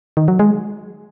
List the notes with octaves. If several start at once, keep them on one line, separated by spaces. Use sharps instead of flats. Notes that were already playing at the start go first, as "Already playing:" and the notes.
D#3
F#3
G#3